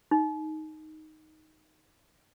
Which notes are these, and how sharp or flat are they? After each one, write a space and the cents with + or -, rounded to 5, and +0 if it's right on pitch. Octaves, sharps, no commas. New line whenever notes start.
D#4 +5